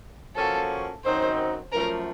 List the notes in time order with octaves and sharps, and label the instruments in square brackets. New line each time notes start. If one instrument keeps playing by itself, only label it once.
[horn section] F3 A#3 C#4 F#4 [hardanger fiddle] A4
[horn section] F#2 D#3 F#3 C4 D#4 [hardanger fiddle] C5
[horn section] F#2 F3 A3 [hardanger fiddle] A#4